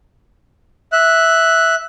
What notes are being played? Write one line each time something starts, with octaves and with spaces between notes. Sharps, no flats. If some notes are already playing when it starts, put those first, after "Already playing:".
E5 F#6